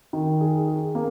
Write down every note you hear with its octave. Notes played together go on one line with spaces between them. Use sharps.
D#3
G#4
G#4
A#3